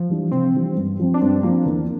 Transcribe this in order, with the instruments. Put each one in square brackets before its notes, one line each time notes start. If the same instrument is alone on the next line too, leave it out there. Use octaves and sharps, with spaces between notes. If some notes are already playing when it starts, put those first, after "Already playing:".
Already playing: [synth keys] F3
[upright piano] E3 G3 D4
[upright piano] C3 [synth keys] C4
[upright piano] E3 G3 D4
G2
F3 C4
[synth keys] D4
[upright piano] G2 [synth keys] C4
[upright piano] F3 C4 [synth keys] A#3
[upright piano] E2